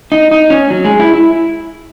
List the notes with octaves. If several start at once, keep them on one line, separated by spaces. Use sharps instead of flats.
D#4
D#4
C#4
F#3
G#3
E4
E4